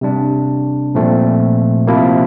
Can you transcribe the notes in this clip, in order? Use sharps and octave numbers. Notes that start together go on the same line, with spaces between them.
C3 G3 D4
A#2 F3 A3 C4
C3 F3 A#3 E4